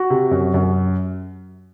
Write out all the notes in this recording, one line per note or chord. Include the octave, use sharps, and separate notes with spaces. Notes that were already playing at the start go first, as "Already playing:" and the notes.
Already playing: F#4
C3
F#2
F#2